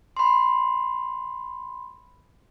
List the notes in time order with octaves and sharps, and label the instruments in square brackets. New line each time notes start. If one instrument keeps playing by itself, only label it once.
[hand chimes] B5 C6